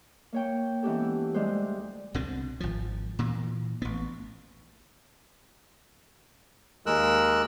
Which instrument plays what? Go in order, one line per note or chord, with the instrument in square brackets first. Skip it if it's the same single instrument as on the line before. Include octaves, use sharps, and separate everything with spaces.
[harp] A#3 C#5 G5
E3 G#3 B3 C#4 G4 A4
D2 G3 G#3 C5
[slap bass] C2 B2 D3 C4
G#1 F3
A#2 E3 A#3
A1 B3
[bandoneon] D#2 G#3 A#4 E6 F#6